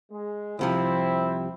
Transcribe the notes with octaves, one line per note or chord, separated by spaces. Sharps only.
G#3
C2 C3 F3 C4 E4